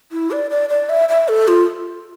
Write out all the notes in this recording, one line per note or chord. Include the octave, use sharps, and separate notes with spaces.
E4
D5
D5
D5
E5
E5
A4
F4